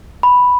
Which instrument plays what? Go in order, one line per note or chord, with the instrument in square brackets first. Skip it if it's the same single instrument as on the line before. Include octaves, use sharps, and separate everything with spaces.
[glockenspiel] B5